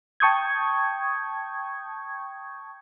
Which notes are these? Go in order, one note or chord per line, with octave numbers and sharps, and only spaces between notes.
G5 A5 C#6 D#6 G6 G#6